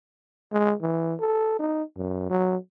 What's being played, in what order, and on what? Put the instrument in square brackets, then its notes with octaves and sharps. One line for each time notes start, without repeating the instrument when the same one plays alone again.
[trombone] G#3
E3
A4
D#4
F#2
F#3